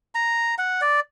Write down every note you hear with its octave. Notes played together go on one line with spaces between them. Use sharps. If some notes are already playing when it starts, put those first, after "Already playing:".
A#5
F#5
D5